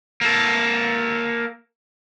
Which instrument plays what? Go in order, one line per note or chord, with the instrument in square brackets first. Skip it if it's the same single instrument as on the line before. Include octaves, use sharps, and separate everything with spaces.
[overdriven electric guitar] A#3 A4